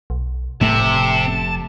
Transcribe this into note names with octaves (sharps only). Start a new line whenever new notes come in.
B1
F1 A2 C3 A3 A5